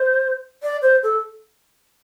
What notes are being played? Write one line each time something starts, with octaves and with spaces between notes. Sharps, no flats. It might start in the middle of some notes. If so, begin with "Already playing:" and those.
Already playing: C5
D5
C5
A4